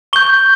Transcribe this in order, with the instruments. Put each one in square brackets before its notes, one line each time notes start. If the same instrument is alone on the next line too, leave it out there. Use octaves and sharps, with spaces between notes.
[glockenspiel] C#6 G6 G7